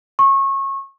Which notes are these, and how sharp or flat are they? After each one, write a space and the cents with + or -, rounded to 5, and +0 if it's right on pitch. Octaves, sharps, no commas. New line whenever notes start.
C#6 -25